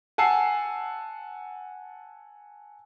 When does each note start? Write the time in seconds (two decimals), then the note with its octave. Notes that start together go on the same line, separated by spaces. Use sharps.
0.18 F#5 G#5 A5 E6 C7